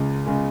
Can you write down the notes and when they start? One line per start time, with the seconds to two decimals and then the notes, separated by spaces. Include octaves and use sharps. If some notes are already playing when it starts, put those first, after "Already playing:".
Already playing: C#2 C#3 G#3
0.26 C#3 G#3